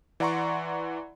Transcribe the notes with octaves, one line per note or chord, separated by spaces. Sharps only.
E3 D5 F#5 A#5 C6 C#6